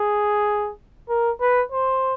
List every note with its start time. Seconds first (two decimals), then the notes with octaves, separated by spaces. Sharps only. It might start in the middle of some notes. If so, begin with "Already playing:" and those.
Already playing: G#4
1.09 A#4
1.41 B4
1.72 C5